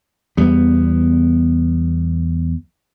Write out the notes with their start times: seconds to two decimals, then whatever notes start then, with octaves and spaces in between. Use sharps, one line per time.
0.37 E2 G3 B3